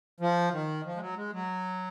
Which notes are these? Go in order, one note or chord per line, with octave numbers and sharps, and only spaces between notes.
F3
D#3
F3
G#3
F#3
G#3
F#3